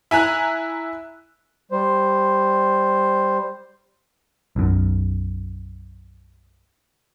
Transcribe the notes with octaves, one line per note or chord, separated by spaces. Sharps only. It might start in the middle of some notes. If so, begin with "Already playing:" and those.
E4 G#5 A#5 F#6
G3 C5
B1 F#2